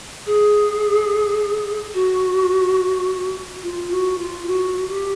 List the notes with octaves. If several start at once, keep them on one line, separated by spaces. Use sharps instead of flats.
G#4
F#4
F4
F#4
F4
F#4
G4